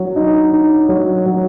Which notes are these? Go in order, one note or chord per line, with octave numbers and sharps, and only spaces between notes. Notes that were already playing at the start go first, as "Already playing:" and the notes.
Already playing: F#3
D#4
D#4
F#3
F#3